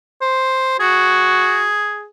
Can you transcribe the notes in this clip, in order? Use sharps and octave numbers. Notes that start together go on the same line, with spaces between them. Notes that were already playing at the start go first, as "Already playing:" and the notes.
C5
F#4 G#4